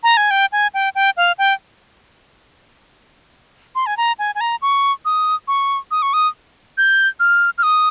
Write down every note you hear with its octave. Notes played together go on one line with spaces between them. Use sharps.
A#5
G#5
G5
G#5
G5
G5
F5
G5
C6
G#5
A#5
G#5
G#5
A#5
C#6
D#6
C#6
D#6
C#6
D#6
G6
F6
F6
D#6